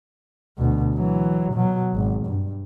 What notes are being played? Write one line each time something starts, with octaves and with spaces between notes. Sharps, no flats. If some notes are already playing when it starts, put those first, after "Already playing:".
D2 B2
E3 F#3
B2 F#3
G#1
G2